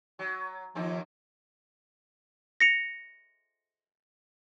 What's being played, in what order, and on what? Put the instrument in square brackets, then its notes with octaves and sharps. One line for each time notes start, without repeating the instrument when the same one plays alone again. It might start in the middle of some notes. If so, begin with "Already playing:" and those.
[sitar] F#3
[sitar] D#2 C4 D#4 [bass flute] F3
[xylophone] A#6 C#7 F7